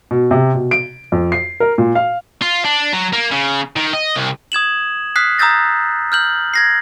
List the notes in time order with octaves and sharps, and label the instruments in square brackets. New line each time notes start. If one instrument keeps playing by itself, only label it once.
[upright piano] B2
C3
B2
D7
F2
C7
A#4
A#2
F5
[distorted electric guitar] F4
D4
F#3
A#3
C#3
D#3
D#5
C2
[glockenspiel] D#6 G#6 E7 F#7
D#6 F6 F#6 B6 C7
A#5 D#6 E6 G6 A6 A#6
F6 G6 F#7
G#6 A#6 C7